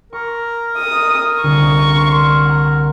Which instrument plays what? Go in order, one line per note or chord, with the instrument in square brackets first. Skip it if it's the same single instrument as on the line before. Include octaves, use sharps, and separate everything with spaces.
[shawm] A#4 [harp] C#6
[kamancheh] D#6
[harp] C2 D3 [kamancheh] C#6
[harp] C6 C7
F#5 A#5